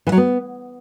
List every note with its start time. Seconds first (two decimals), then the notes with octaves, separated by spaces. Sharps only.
0.07 E3
0.12 F#3
0.17 B3